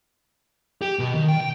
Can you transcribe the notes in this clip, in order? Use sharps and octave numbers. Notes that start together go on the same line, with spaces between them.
G4
B2
D#3
G5
G5